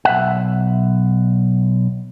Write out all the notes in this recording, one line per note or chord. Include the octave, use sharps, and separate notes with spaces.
B1 E5 F#5